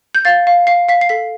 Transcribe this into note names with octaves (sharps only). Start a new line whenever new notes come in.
G6
F5 A6
F5
F5 C7
F5 B6
C7
A4 B6